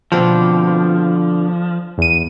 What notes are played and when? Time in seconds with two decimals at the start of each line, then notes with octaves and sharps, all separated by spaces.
0.12 B2 D3 F3 C4
1.98 E2 D#7